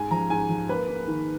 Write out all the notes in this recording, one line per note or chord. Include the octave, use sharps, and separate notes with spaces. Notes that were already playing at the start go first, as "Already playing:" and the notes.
Already playing: G#2 G#5
F3 A#5
G#2 G#5
F3
A#3 B4
A#3
D#3